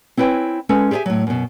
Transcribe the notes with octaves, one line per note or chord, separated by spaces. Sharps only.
C4 E4 B4 C#5 G5 G#5
G#3 C#4 A4 B4
G4 G#4 C5 E5 G#5
A2 F#3
F#2 B2